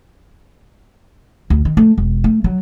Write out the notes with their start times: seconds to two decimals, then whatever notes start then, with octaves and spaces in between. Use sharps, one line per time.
1.50 D2
1.65 D#3
1.77 A3
1.98 E1
2.24 A3
2.44 F#3